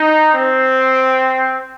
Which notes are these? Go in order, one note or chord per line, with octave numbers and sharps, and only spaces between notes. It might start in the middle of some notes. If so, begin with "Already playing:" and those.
Already playing: D#4
C4